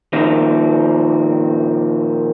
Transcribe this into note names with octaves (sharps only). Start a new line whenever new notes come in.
A#2 D#3 F3 A#3 C4